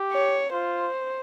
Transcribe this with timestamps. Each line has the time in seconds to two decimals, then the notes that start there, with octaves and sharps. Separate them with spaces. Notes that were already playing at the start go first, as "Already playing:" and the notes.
Already playing: G4
0.13 C#5
0.52 F4 C5